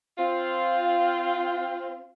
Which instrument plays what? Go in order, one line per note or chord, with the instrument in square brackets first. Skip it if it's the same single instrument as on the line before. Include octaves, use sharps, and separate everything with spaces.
[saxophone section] C4 F4